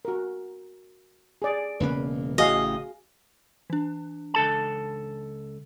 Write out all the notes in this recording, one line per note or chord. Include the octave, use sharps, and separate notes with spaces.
F#4 A#4
G#4 D5
E1 C#3 A#3 B4
A1 C#3 F#4 G#4 D#5 F5
E3 D4
C#2 A4 A5